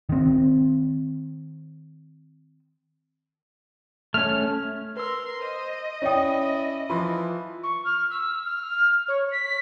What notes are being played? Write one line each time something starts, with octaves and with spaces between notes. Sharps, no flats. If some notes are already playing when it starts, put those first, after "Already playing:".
D#3 C4
A3 C#4 F6
A#4 B4 C6 E6
C5 D#5
C#4 E4 C#5 D5 G5 D#6
E3 F3 B5 C6
C#6
F6
E6
F6
C#5
B6